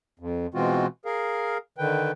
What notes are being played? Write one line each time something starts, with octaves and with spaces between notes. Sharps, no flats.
F2
B2 E3 G#3 C4 F4 F#4
G#4 A#4 F5
D3 D#3 B4 G5